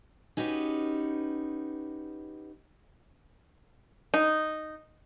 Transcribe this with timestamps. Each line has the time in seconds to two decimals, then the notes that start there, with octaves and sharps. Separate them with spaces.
0.37 C#4 D#4 F#4 G4 B4
4.14 D#4